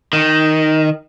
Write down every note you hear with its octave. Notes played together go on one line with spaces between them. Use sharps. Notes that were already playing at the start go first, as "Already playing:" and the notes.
D#3